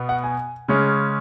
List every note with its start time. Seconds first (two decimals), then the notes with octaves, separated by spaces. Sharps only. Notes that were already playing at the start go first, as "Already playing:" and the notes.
Already playing: B2 B3
0.09 F#5
0.24 G#5
0.68 C#3 G#3 C#4